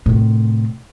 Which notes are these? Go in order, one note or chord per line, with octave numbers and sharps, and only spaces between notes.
A2 C3